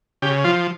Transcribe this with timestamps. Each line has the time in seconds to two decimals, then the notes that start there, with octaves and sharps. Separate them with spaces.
0.22 C#3 G4
0.44 F3 F4